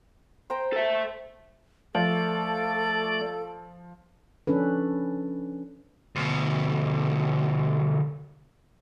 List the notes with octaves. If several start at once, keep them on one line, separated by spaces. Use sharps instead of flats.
C5 G5 A#5
A4 E5
F3 A3 A4 D5
F3 C#4 D4 A4 B4
D2 B2